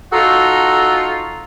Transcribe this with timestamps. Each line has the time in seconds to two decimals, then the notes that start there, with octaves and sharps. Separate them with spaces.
0.13 D#4 F4 F#4 A4